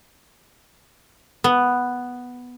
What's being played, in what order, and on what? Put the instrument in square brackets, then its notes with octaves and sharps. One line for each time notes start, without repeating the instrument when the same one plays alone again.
[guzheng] B3